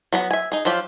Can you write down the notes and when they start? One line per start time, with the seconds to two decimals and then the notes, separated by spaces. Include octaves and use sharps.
0.13 F#3 B3 A#5
0.31 E5 G#5
0.52 D#4 G#4
0.65 F3 F#3 F4 G4